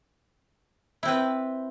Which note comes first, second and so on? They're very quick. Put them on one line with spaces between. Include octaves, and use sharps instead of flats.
E4 C4 B4